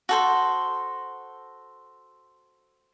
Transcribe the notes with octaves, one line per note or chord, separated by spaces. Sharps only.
F#4 A4 C5